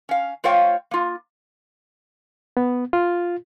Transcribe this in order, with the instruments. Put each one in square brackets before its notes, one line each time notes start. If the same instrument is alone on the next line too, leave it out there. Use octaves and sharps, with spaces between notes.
[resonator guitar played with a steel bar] C#4 F5
A3 F4 C5 C#5 F5 G5
A#3 F4
[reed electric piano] B3
F4